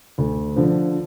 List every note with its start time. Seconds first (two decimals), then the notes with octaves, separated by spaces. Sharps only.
0.18 D2
0.56 D3 F3